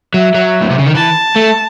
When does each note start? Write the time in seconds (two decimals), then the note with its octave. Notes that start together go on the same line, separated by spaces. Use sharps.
0.14 F#3 E5
0.35 F#3
0.62 A2
0.71 C3
0.79 C#3
0.87 D#3
0.95 E3 A5
1.36 A3